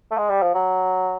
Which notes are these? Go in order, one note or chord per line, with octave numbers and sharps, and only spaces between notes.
A3
G#3
G3
F3
F#3